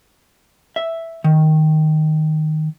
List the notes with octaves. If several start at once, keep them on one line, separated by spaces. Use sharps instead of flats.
E5
D#3